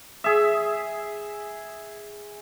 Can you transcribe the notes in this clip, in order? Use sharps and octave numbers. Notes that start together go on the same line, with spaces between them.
G#4 E5